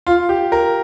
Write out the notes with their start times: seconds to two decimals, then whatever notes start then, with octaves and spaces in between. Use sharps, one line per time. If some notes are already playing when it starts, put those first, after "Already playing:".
0.07 F4
0.29 G4
0.52 A#4